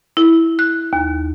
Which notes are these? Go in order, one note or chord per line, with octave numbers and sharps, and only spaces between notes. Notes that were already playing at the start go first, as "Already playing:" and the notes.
E4
F#6
D#2